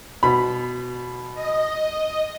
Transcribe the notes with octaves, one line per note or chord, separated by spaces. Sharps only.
B2 B5
D#5